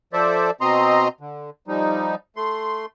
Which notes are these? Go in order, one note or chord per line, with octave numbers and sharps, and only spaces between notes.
F3 A4 C5 D5 E5
B2 C4 D#5 A#5 C6
D3
F3 G3 D#4
A3 C6